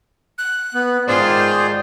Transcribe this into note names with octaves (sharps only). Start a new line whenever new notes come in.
F#6
B3
G#2 D#3 F4 G#4 C5 D5
G6